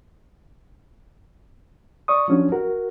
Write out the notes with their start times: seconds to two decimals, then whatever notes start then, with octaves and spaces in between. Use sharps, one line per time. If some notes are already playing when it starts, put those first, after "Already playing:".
2.08 D5 C#6 D#6
2.28 F3 F#3 C#4 D4 F#4
2.52 F#4 A#4